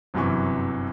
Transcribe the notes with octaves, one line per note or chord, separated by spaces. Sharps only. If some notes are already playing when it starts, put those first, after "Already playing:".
G1 F#2 C3 E3 C#6